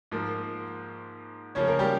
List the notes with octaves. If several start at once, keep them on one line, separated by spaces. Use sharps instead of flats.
G#2 F3 A#3
C#3 F3 A#3 C#4 C#5
A#3 A#4
G3 G4